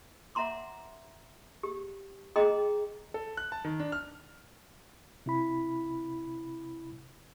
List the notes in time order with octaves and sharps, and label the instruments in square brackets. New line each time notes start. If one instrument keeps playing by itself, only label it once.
[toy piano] C#5 E5 F#5 A#5 C6 D6
G4
G#4 D#5 G5 A#5 C6
[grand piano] A4
F#6
A5
D#3
D4
F6
[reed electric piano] C3 E4 B5